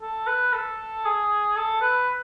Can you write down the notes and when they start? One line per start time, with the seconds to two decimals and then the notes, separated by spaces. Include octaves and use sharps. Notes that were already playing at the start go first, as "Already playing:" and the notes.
0.02 A4
0.27 B4
0.53 A4
1.05 G#4
1.56 A4
1.82 B4